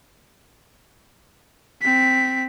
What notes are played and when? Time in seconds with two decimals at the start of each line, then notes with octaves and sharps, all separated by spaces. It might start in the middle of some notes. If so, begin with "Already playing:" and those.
1.81 C4 B6